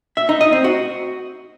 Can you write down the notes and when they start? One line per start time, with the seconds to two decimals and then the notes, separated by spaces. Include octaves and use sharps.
0.17 E5
0.29 D#4
0.41 D#5
0.53 C4
0.64 F#4